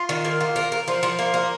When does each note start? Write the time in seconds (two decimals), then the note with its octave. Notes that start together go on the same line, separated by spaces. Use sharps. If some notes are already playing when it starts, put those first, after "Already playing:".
Already playing: F4
0.09 D#3
0.25 A#3
0.41 F4
0.56 A#4
0.72 A#4
0.88 F3
1.03 F3
1.19 A#3
1.34 A#3